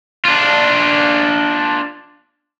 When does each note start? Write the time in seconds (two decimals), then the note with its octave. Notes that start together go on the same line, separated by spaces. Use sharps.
0.25 D4 F4